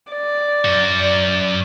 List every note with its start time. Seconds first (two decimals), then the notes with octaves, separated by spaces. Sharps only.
0.12 D5
0.65 F#2 F#4